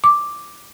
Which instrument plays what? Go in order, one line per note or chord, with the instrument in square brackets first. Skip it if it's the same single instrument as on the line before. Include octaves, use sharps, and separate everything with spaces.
[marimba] D6